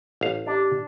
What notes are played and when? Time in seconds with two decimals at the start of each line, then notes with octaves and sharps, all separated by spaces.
0.21 A1 F5
0.46 D4 G4